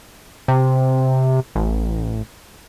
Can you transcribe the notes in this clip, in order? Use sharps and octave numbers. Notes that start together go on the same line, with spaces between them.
C3
A1